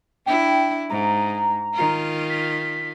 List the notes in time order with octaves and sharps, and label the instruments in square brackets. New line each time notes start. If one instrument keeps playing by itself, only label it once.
[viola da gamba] D4 E4 [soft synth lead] G5
[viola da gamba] G#2 [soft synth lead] A#5
[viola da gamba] D#3 F4
[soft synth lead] B6